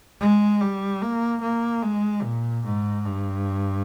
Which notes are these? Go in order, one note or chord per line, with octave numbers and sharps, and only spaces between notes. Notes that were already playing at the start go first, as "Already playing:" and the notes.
G#3
G3
A#3
A#3
G#3
A#2
G#2
G2